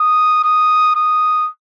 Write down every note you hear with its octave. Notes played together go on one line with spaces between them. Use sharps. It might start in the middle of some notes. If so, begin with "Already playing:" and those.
Already playing: D#6
D#6
D#6